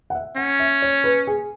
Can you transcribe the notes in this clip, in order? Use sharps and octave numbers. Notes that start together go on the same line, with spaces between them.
F#5
E5
C#4 F#5
E5
C#5
B4
G#4